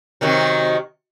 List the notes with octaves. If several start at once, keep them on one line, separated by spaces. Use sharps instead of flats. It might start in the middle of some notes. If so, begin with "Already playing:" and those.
C3 D#3 F#3